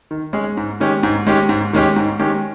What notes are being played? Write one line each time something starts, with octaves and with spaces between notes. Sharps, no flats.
D#3
G#3 C#4 G#4
G#2
D#3 G#3 C#4 G4
G#2
D#3 G#3 C#4 G4
G#2
D#3 G#3 C#4 G4
G#2
D#3 G#3 C#4 G4